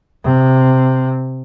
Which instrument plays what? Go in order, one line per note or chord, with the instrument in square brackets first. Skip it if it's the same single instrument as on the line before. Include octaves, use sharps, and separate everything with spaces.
[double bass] C3